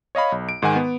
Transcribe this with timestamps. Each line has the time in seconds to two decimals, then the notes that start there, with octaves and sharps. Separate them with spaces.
0.15 C#5 D#5 F5 B5
0.32 B1
0.49 D7
0.62 G#2 D#3 F#5 G#5
0.76 B3